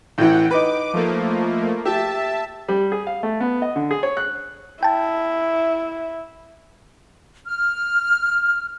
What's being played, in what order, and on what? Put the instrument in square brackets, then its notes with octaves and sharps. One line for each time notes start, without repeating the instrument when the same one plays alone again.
[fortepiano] A1 E3 [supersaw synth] F#5 G5
[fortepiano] D#4 B4 [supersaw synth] D6
[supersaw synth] F3 A3 A#3
[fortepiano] G4 [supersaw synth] E5 A5
[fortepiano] G3
G#4
F5
A3
B3
D#5
D3
G#4
C#5
F#6
[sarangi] E4 [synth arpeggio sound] G5 A5
[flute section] F6